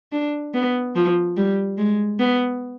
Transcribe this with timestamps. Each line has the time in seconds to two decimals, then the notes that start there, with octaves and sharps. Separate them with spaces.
0.12 D4
0.54 B3
0.96 F3
1.37 G3
1.78 G#3
2.19 B3